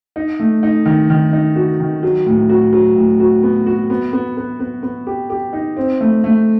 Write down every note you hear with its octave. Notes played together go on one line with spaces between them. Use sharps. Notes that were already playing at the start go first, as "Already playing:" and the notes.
D#4
A3
D#4
D#3
D#3
D#4
F#4
D#3
F#3
A2
F#4
F#3
A2
F#4
B3
F#4
B3
B3
B3
B3
B3
G4
G4
D#4
C4
A3
A3